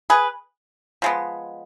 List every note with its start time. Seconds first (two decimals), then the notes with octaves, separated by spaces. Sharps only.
0.10 G#4 B4
1.02 F3 G#3 B3